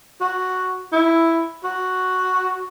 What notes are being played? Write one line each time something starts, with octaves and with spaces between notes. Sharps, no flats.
F#4
E4
F#4